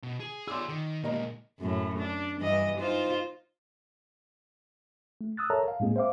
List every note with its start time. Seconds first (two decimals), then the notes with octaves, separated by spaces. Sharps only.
0.03 B2
0.20 G#4
0.48 G#4 D5 C6 D6 E6
0.69 D#3
1.03 A#2 G#3 A#3 D#5 A#5
1.60 F#2 A2
1.98 D4
2.40 G2 E3 D#5
2.79 D#4 F4 C5
5.21 A3
5.37 D#6 E6 F#6 A6
5.50 A4 A#4 C#5 E5 A5 A#5
5.68 F5
5.80 A2 G#3 A#3 C4 G#4
5.96 C5 E5 F5 D6